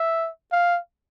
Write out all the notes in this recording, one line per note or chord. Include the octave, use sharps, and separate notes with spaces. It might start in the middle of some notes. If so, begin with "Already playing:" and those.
Already playing: E5
F5